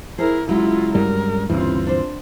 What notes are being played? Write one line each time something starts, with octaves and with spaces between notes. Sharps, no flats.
E4 G#4 A#4 C5
C#3 F#3 G#3 E4 F4
G2 G3 A#4
D2 G2 C#3 E3 C4 F4
D4 C5